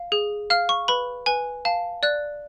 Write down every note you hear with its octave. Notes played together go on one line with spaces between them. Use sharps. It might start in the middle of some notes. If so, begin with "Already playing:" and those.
Already playing: F5
G#4
F5 F6
C#6
B4 B5
B4 G#5
F5 A5
D5 F#6